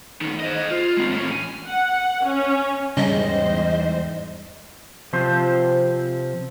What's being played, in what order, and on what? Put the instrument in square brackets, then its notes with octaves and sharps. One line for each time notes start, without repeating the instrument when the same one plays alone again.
[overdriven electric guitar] B1 D#3
C5 D#5
F4
G#3 C4
A2 C#4
G#5
[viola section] F#5
C#4
[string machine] E2 G#2 C5 [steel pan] C#3 C#4 [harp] G3 [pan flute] D#5
[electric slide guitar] C3 F3 C4 C5